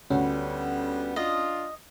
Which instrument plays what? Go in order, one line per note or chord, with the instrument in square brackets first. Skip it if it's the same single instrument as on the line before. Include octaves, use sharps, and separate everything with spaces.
[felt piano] D2 [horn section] D3 G3 B3 [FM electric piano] C#4
[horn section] D4 F4 [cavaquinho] D#5